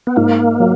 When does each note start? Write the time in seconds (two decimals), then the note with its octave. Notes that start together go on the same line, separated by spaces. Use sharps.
0.07 B3
0.16 G#2 A#3
0.60 F#3